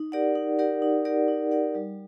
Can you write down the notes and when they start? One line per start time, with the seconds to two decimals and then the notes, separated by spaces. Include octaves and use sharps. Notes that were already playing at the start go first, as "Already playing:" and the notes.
Already playing: D#4
0.12 G4 A#4 D5 F#5
0.35 D#4
0.59 G4 A#4 D5 F#5
0.82 D#4
1.05 G4 A#4 D5 F#5
1.28 D#4
1.51 G4 A#4 D5 F#5
1.75 G3